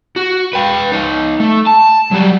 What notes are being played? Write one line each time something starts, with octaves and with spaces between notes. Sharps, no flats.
F#4
B4 G5
D#4 C#5
A3
A5
F#3 G3